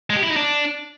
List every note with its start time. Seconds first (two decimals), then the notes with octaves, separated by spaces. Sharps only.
0.10 G#3
0.16 G4
0.23 E4
0.30 D#4
0.37 D4